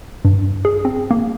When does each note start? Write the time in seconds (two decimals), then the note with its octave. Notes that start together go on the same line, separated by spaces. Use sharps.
0.25 G2
0.65 G#4
0.85 C4
1.11 A#3